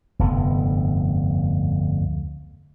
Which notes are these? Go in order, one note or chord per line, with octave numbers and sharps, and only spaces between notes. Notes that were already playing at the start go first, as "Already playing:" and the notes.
F1 D2 G2 B3